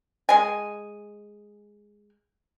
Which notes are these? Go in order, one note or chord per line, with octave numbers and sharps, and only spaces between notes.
G#3 G#5